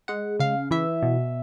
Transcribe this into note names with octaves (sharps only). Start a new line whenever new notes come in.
G#3 F#5
C#3 F5
E3 E5
B2